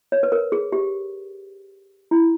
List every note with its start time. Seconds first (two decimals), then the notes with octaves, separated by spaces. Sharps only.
0.12 C#5
0.23 B4
0.32 A#4
0.52 G#4
0.72 G4
2.11 E4